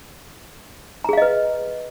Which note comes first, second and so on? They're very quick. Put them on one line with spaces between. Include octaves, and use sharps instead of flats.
A#5 G#4 F5 D#5 B4